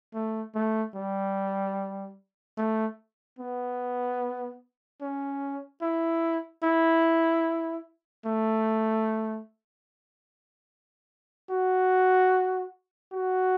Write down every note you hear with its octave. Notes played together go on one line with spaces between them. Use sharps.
A3
A3
G3
A3
B3
C#4
E4
E4
A3
F#4
F#4